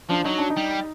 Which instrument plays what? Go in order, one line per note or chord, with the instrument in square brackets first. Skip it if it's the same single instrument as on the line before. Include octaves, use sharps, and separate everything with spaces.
[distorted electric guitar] F3 [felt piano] D4
[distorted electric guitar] F#3 [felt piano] D#4
[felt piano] D4
D#4
[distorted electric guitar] G3